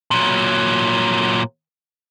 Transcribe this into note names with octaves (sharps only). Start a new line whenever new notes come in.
A#2 F#3